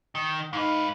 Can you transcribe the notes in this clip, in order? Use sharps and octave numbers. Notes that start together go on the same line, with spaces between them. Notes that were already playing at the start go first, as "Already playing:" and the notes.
D#3
G#2 D#4 B4 F5